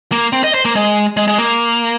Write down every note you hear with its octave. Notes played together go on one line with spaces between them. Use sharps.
A#3
C4
D#5
C5
A#3
G#3
G#3
G#3
A#3